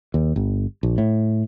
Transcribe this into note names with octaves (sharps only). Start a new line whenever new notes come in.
D#2
G1
A#1
A2